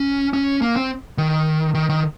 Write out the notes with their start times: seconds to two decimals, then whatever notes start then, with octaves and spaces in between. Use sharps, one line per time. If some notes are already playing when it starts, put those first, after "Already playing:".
Already playing: C#4
0.33 C#4
0.62 A#3
0.76 C4
1.18 D#3
1.74 D#3
1.90 D#3